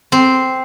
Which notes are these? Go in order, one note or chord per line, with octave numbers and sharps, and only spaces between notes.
C4